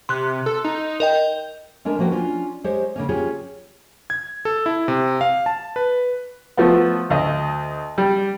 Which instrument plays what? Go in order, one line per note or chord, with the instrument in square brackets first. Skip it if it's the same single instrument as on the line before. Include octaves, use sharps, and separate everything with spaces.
[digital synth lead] C3 [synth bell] C6 F#6
[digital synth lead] A4
D#4
[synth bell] A#4 D#5 G5 [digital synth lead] G6
[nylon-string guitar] G#3 C#4 D4 A#4
F3 A#3 F#4 B4 G5
C#4 D4 F4
G#3 G4 C5 C#5
C#3 A#3 C#4
C#4 F4 G4 G#4 C#5
[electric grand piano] G#6
A4
E4
C3
F5
A5
B4
[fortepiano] F3 A3 B3
D2 D#5
G3